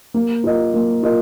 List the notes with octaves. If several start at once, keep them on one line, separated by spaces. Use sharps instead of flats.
A#3
F4 A#4 D#5
A#3
F4 A#4 D#5